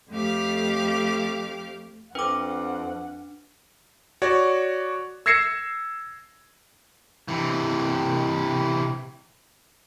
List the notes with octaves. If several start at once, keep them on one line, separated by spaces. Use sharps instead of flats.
F2 A3 G4 F5 D6
F2 D4 B4 F#5 D6
F#4 C#5 D5
E6 G#6 A#6 C7 C#7 E7
C3 E3